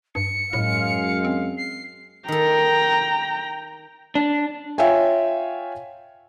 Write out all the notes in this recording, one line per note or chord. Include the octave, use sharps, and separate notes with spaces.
G2 C#7
F#2 A2 G#3 F5
C4
C7
D#3 A4 G5 A#5
D4
F4 C#5 E5 F5 G5 G#5